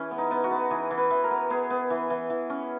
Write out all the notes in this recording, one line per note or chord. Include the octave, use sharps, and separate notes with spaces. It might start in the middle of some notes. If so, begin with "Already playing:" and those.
Already playing: E3 C#4 G#4 B4
B3
D#4
B3
F#4
B3
E3 G#4
E3
B4
E3
A#4
B3
B3 G#4
B3
E3
E3
E3
C#4